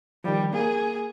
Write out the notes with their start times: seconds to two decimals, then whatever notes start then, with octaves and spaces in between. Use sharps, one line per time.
0.24 D#3 F3 G3
0.53 A#3 G#4